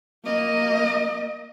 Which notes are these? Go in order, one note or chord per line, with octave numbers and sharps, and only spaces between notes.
A#3 D#5